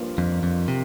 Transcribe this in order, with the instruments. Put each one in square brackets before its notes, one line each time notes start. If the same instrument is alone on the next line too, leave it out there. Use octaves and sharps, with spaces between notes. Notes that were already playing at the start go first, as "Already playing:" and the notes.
Already playing: [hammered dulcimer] G2 F3 A#3
[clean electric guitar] F2
F2
C3